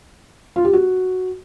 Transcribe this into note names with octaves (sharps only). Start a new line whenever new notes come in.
F4
G4
F#4